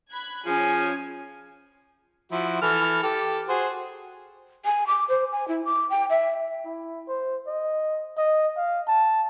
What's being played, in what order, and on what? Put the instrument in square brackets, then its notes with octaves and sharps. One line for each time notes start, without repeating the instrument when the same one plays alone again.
[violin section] B5 F#6 G#6
[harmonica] F3 [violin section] C#4 [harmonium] G#4 [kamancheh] G#5
[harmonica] F3 E4 F#4
E3 A4 F6
G4 A4
F#4 G#4 C5
[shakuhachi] G#5
D6
C5
G#5
E4
D6
G5
E5
[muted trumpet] E4
C5
D#5
D#5
F5
A5